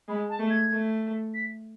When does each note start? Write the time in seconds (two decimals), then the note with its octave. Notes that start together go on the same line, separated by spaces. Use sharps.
0.08 G#3 B5
0.29 A5
0.39 A3
0.50 G#6
0.71 A3
1.34 B6